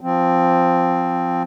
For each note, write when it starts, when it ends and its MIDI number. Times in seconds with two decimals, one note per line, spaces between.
0.01 1.43 53
0.01 1.43 60